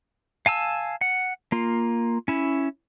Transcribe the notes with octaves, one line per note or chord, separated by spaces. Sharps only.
F5 G#5 A5 E6
F#5
A#3 F4
C#4 E4